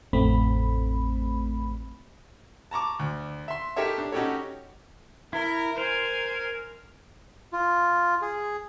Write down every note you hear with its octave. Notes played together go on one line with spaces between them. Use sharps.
A1 F2 A3 C4 B5
A5 A#5 C#6 D6
D2
E5 C6
D#4 G4 A4 A#4 C#5 E5
D4
C#4 D#4 F#4 G4 A4 C#5
E4 A#4
A#4 C5 G#5
F4
G#4